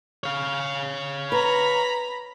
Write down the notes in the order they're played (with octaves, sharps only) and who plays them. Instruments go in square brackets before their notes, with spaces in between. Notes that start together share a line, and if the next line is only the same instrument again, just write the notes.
[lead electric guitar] C#5 F5
[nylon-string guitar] B4 [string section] A#5 B5